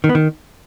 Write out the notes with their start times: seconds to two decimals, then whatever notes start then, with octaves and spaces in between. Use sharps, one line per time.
0.04 D#3
0.09 B3
0.15 D#3